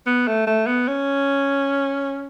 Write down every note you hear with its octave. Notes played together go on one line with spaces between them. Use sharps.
B3
A3
A3
B3
C#4